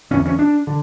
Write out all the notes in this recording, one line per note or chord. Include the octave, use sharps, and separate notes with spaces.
E2 D3 C#4
C#4
D4
D3